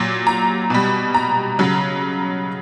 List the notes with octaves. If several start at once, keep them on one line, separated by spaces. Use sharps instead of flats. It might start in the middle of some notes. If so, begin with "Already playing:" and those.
Already playing: A#2 F#3
A#5
B2 G3
A#5
C#3 F#3